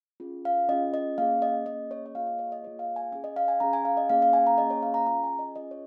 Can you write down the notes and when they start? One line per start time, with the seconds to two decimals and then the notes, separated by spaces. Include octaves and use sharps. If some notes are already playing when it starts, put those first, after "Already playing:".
0.20 C#4 F4 G#4
0.45 F5
0.69 C#4 F4 G#4 D#5
0.94 D#5
1.18 A#3 C#4 G#4 F5
1.42 D#5
1.66 A#3 C#4 G#4 D#5
1.91 C#5
2.06 D#5
2.15 A#3 F4 G#4 F5
2.27 D#5
2.39 C#5
2.52 D#5
2.63 A#3 F4 G#4 C#5
2.79 F5
2.96 G#5
3.12 C#4 G#4 G#5
3.24 D#5
3.36 F5
3.48 G#5
3.60 C#4 G#4 A#5
3.73 G#5
3.85 F5
3.97 D#5
4.10 A#3 C#4 G#4 F5
4.22 F5
4.33 G#5
4.47 A#5
4.58 A#3 C#4 G#4 D#5
4.70 C#5
4.83 F5
4.94 A#5
5.07 C#4 F4 G#4 A#5
5.24 G#5
5.39 D#5
5.56 C#4 F4 G#4 D#5
5.71 C#5